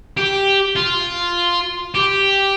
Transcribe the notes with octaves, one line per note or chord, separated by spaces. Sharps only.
G4
F4
G4